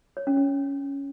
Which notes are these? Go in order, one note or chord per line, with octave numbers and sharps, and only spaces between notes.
C#5
C#4
C#4